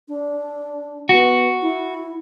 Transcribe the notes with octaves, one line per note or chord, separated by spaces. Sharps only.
D4
B3 F#4
E4